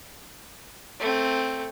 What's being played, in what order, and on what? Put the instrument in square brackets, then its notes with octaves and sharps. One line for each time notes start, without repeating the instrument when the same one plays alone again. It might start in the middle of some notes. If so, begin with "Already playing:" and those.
[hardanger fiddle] A3 C4